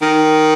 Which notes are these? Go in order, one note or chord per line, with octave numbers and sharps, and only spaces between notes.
D#3